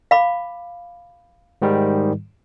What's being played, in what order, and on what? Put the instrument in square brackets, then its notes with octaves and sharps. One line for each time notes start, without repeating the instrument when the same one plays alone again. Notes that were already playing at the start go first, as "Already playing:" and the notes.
[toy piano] F5 B5 D6
[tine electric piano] G#2 D#3 G3